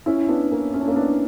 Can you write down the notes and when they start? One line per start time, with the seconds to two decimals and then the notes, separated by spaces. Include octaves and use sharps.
0.06 C#4 E4
0.28 B3 D4
0.51 A#3 C#4
0.74 C#4
0.81 D4
0.87 A#3 C#4
0.96 B3 D4